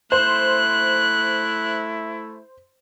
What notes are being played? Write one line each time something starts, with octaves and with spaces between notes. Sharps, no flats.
A3 E4 C5 F#6